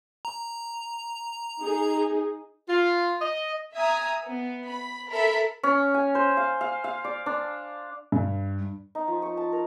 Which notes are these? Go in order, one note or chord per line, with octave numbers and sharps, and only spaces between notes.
A#5
D#4 G#4
F4
D#5
E5 G#5 A#5 D#6
B3
B5
A4 A#4 E5 B5
C#4
G#5
C5
F5
F5
F5
D5
D4
G2
D#4
F3
C#6
A5
A#4